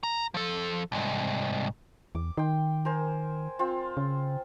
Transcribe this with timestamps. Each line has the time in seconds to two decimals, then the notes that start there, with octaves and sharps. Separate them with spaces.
0.03 A#5
0.34 F3 A4
0.92 C2 G#2
2.15 E2 D6
2.37 D#3 G5 C6
2.85 A#4 C5 G#5
3.59 C4 F4
3.97 C#3